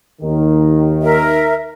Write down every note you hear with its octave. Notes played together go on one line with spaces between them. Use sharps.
D#2 D#3
A#4 E5